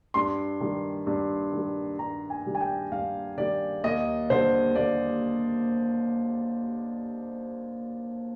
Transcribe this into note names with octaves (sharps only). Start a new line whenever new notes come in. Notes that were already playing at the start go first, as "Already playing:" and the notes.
G2 C6
D#3 G3
G2
D#3 G3
G2 A#5
G#5
D#3 G3
G#5
G5
G2 F5
D#3 G3 D5
D#2 D#5
D3 G3 C5
D#2 D5